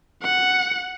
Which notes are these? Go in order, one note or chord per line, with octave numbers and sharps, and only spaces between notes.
F#5